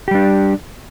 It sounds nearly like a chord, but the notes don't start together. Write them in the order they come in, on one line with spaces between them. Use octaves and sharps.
G4 G3 D4